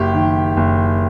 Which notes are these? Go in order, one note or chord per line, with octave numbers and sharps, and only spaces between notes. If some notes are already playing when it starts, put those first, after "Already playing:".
Already playing: F#1 G4
D#3
F#1